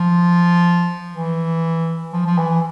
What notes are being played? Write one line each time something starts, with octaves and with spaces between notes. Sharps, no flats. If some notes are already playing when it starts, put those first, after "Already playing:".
Already playing: F3
E3
F3
F3
E3